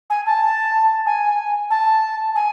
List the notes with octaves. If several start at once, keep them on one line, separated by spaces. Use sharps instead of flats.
G#5
A5
G#5
A5
G#5